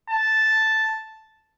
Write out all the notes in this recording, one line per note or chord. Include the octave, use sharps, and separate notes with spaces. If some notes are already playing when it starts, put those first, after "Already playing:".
A5